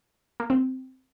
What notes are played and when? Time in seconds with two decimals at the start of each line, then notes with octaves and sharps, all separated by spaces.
0.40 A#3
0.50 C4